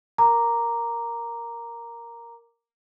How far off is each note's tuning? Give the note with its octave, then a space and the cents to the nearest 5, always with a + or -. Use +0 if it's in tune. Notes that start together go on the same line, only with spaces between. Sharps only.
A#4 +0 A#5 +0 D6 +0